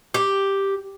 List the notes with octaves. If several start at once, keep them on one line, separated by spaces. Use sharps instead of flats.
G4